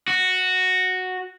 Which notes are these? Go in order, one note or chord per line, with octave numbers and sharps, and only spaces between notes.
F#4